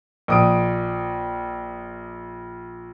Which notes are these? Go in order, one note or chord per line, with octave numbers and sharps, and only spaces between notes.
A#1 D#6 D7